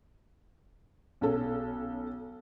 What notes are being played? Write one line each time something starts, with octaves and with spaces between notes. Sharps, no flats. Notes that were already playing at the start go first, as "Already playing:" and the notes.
B1 C#4 A4